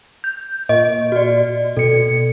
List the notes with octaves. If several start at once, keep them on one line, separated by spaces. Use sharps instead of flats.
G6
A#2 D#5
F#4 D5
B2 A4 C#7